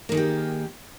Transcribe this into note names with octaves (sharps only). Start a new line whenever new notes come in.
D#3 A#3 G4 G#4